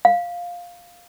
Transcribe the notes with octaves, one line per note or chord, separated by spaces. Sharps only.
F5